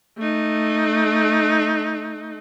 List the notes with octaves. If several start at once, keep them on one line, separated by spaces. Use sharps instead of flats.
A3 D#4